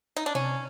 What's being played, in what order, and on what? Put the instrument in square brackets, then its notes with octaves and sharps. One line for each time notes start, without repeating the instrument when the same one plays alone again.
[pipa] D#4
D4
[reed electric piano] C3 [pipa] C#4